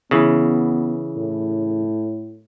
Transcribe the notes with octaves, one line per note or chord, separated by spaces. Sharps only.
C#3 E3 B3
A2